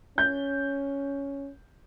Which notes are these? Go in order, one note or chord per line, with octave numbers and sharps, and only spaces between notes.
C#4 G6